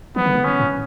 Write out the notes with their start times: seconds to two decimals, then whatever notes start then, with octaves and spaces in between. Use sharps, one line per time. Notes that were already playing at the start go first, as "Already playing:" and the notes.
0.16 F3 B3
0.26 D3
0.35 C#3
0.45 C#4
0.59 A2